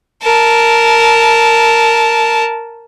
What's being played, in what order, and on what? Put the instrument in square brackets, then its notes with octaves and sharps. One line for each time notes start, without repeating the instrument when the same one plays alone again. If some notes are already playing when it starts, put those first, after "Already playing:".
[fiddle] A#4 A5